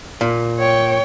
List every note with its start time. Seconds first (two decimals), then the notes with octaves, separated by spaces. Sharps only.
0.21 A#2
0.59 C#5 G5